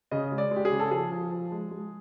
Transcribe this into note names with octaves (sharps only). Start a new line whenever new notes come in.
C#3 D#5
G#3
D5
G#3
G4
G#4
C#3
A4
F3 G#4
F3
F3
G#3
G#3